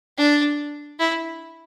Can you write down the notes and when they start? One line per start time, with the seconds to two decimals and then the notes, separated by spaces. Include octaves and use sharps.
0.17 D4
1.00 E4